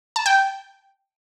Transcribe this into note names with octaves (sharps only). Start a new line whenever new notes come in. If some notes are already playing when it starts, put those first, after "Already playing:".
A5
G5